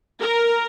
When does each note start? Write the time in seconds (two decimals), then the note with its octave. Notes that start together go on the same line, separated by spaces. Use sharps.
0.21 A#4